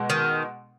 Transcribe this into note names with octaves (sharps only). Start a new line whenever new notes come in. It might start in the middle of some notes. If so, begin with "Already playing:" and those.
Already playing: B2 G#3
D#3